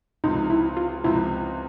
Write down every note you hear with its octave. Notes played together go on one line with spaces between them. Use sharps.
C#2 C3 F3 D#4
E4
F4
C#2 C3 F3 E4